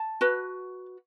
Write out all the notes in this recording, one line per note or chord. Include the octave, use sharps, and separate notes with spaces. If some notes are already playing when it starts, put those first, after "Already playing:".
Already playing: A5
F#4 B4